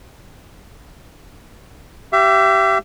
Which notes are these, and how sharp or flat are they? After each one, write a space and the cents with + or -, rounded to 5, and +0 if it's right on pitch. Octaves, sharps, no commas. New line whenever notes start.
G4 -20 E5 +35